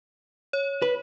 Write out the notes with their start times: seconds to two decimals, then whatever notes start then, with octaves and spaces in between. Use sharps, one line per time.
0.53 C#5
0.82 B4